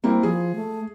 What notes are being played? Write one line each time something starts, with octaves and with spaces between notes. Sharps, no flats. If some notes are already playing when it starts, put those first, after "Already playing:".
G3 A#3 C4 E4
F3 G#4
A3